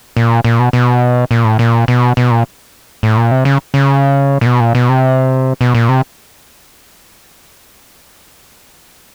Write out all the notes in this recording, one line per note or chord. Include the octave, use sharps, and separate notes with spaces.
A#2
A#2
B2
B2
A#2
A2
A#2
B2
B2
A#2
A2
A#2
C3
C#3
C#3
A#2
B2
A#2
B2
C3
B2
A#2
C3